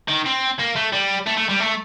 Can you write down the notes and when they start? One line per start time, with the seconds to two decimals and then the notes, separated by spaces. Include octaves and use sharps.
0.08 D#3
0.26 C4
0.59 A#3
0.76 A3
0.93 G3
1.27 A3
1.37 A3
1.49 G3
1.60 A3